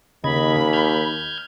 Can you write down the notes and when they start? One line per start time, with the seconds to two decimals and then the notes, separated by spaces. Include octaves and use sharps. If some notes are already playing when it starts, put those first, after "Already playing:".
0.24 D#2 C#3 D#5 B5 G#6
0.73 F6 G6 G#6